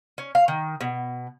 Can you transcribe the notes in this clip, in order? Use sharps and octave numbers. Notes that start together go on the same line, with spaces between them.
C#4
F5
D#3
B2